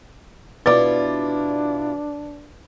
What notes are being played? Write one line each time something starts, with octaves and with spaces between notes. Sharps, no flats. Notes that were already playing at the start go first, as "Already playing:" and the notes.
B2 D4 E4 F4 B4 D5 D6 A6